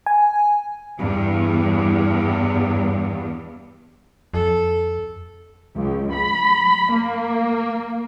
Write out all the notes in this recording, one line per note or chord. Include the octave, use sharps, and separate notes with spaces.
G#5
E2 G2
F2 A4
C#2
B5
A#3